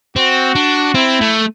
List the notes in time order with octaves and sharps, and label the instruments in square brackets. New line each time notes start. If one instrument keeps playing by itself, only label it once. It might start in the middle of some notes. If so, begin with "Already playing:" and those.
[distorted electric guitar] C4 [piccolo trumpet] F#4
[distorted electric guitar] D4
[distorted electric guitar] C4 [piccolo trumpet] E4
[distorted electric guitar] A3